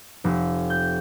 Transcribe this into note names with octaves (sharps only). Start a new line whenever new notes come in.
F1
G6